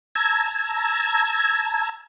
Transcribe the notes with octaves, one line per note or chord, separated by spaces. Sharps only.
A5 A#5 E6 G#6